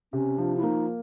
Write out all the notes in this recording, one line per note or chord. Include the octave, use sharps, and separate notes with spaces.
C3 C#4
F3 D4
E4
A#3 D#4